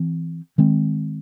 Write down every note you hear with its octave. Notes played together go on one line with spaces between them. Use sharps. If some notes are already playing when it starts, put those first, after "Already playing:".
Already playing: E3 C4
D#3 G#3 C4